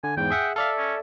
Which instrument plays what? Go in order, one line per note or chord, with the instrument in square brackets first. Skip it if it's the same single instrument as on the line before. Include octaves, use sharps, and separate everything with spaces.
[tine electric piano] D3 [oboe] G#5
[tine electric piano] E2 G#2 [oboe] G5
[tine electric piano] G#4 E5 F#5
[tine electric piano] A4 D5 E5 [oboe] F5
[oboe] C#4